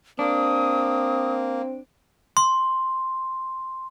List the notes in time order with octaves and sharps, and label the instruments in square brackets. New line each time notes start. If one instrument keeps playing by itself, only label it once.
[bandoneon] A#3 [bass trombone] C4 [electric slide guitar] D4 [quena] D#6
[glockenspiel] C6